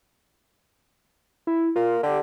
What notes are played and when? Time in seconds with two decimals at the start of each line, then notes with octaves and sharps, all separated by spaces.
1.47 E4
1.76 A#3 F4
2.03 D3 G4